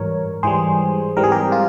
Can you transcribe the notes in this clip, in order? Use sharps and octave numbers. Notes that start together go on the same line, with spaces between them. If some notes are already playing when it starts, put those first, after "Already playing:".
Already playing: G#2 E3 G3 A#4 C#5
G#2 E3 G3 G#4 C5
G#2 E3 G3 C4 A#4
G#4
G4 A#4
F4